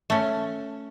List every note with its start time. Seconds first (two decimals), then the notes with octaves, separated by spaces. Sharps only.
0.10 A3 C#4